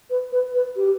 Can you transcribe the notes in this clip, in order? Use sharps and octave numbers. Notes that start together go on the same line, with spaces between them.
B4
B4
B4
G4